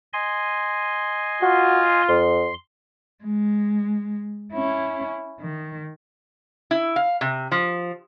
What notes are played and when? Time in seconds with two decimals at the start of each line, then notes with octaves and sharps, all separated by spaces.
0.13 D#5 G#5 C6
1.42 F4 F#4
2.09 F2 C6
3.24 G#3
4.53 C#4 E4
5.40 D#3
6.71 E4
6.96 F5
7.21 C3
7.52 F3